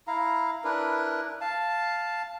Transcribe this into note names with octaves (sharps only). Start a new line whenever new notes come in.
E4 F5 A#5
D4 E4 A#4 B4
F5 A5